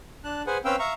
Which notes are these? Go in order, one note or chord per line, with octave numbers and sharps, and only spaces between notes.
D4 A5 F#6
G#4 B4 C5 F#5 G#5
C4 C#4 B4 F5 G5 E6
E5 F5 A#5 C#6